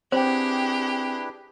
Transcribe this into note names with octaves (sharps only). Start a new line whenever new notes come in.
C4 D4 E4 G4 G#4 B4 C5 G5